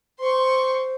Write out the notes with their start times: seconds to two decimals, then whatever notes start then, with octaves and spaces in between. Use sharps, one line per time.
0.20 C5 C6 C#6